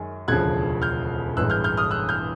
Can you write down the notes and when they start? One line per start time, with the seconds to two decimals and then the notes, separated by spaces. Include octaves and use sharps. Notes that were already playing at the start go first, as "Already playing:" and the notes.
Already playing: F#2 D#3 G#3
0.28 E1 D2 C#3 F3 F#6 G#6
0.82 F6 G6
1.37 A1 G2 E3 G#3 E6 F#6
1.50 F6 G6
1.64 F6 G6
1.77 D#6 F6
1.91 E6 F#6
2.09 F6 G6